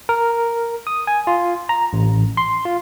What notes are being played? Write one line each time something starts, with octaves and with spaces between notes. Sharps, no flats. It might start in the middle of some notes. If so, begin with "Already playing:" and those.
A#4
D#6
G#5
F4
A#5
A1
C6
F4